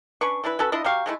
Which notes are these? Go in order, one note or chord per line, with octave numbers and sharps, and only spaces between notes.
C#4 D4 B4 C#6
E3 D4 E4 B4
C#4 F#4 A4 B4
D4 E4 F4 D#5
F#3 G4 F5 C#6
G#3 A3 C#4 E4